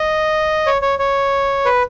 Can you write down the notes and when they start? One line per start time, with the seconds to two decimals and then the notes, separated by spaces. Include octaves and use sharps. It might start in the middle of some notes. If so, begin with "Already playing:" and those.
Already playing: D#5
0.66 C#5
0.82 C#5
0.99 C#5
1.65 B4